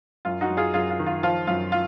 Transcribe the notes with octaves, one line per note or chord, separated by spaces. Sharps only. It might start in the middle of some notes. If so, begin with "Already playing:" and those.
F#2 F4
D#4 F#4
F#2
F4 G#4
F#2 F4 G#4
F4
D#3
F4
F3 F4
F#2 F4
F4